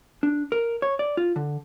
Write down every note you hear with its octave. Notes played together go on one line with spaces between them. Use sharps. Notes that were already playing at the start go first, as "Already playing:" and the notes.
D4
A#4
C#5
D5
F4
D3